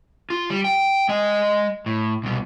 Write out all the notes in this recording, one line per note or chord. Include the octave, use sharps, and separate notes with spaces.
F4
G3
G5
G#3 D#5
A2
C2 B2